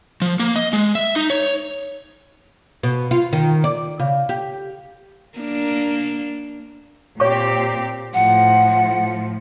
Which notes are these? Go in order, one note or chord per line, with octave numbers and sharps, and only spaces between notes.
F3
A#3
D#5
G#3
E5
D#4
C#5
B2
F4
D#3
D5
C#3
G4
A#3 D4
A#2 C4 G4 C#5 C#6
A2 F3 F#5